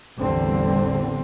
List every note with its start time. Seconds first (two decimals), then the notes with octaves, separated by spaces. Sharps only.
0.18 A1 E2 D3 G3 C4